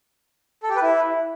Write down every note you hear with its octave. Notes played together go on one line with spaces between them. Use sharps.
A4
G4
B4
E4